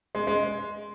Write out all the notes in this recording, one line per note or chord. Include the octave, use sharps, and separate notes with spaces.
G#3
G#3